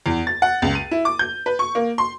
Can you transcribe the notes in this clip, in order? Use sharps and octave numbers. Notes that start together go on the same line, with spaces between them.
E2
A6
F#5
C#2
D#7
E4
D6
G6
B4
C#6
A#3
C6